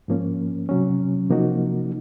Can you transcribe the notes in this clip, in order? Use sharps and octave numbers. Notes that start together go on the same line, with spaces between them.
G#2 F3 A#3 C#4
C3 F#3 C#4
C3 F3 A#3 D#4 F#4